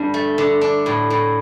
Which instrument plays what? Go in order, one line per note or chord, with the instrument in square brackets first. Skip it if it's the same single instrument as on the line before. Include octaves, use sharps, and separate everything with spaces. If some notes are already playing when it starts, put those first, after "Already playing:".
Already playing: [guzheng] G2 D3 D4
A3
D3
D4
A2
A2